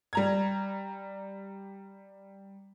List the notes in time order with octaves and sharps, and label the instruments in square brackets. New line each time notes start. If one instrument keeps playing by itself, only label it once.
[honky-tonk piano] G3 A#5 G#6